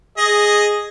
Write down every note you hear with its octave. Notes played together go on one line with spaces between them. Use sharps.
G#4 D#5